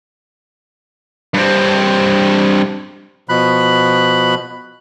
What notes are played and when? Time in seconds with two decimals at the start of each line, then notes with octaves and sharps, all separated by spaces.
1.34 G2 C4
3.29 B2 F3 B5 F#6